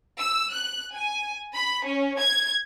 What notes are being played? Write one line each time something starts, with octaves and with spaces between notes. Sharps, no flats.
E6
F#6
G#5
B5
C#4
G#6